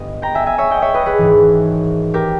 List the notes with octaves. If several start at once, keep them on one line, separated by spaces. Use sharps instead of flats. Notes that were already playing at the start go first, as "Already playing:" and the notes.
Already playing: G1 G2 G3 B3 D#5
G5 A#5
E5 G#5
E5 G#5
C#5 E5
D#5 G5
C#5 E5
B4 D#5
G#4 B4
G#1 G#2 E3
G4 A#4